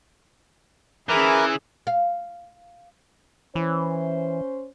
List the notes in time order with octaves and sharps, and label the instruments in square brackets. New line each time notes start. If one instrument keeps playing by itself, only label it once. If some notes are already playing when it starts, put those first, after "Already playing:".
[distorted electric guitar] E3 [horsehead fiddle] C#4 G#4 [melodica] E4 A#4 D6
[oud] F5
[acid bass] E3 [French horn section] C#4 C5